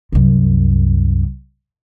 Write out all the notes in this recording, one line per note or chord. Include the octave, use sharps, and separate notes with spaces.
C2 F#2